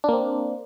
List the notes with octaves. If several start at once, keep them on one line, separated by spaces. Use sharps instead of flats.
A#3 C4 D4